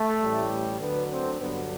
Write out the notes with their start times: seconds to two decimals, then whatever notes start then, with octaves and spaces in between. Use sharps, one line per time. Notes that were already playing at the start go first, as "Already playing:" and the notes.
Already playing: A3
0.22 A1 A2 G3
0.81 D2 D3 F#3 B3
1.11 C4
1.40 G2 D3 F#3 B3